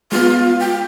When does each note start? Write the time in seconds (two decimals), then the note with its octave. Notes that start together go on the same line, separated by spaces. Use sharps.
0.12 G#3 B3 F4
0.60 G5